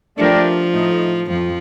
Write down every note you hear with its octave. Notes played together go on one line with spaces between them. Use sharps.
F3 A3 D4 G4 A#4 D5
A2 A3 D#4
F2 F3